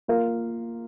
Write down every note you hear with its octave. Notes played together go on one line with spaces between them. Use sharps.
A#3 F4 A#4 F5